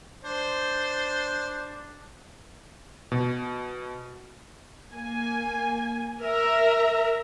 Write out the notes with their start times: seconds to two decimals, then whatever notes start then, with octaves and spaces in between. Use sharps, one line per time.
0.23 D4 C5
3.12 B2
4.92 A#3 G#5
6.23 A#4 E5 A#5